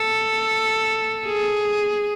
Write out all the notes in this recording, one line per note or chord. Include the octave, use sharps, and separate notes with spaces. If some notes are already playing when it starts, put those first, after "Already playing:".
Already playing: A4
G#4